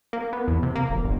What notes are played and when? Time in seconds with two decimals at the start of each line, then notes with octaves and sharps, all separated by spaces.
0.13 A#3
0.33 B3
0.48 E2
0.63 C3
0.75 A#3
0.90 E1
1.04 G1